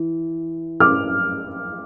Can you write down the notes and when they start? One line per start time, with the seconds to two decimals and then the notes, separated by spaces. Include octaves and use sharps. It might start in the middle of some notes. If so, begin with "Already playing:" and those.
Already playing: E3
0.80 D6 F6